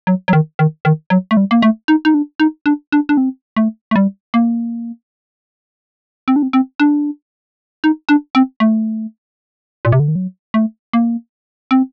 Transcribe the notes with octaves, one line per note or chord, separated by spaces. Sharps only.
F#3
F#3
D#3
D#3
D#3
F#3
A3
G3
A#3
A3
D#4
D#4
D4
D#4
D4
D4
D4
C4
A3
A3
G3
A#3
C4
D4
C4
C4
D4
D#4
D4
C4
A3
A#2
C3
D3
D#3
F#3
A3
A#3
C4